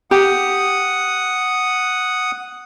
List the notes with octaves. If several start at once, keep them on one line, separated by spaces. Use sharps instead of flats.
G4 F#5 D#6